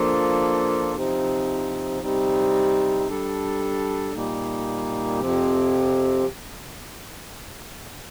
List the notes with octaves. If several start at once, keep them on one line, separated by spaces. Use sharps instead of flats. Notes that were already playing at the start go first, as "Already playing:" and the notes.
Already playing: F3 A#3 D4 F4 A4
C3 F3 C4 D#4
C3 G3 C4 D#4
G3 D4 A4
A#2 G3 A#3 D#4
F2 C3 F3 C4 G4